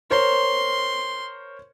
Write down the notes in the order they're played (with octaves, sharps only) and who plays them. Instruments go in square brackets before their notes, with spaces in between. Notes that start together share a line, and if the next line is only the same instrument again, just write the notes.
[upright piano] A#4 C5 C#5 [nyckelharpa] C6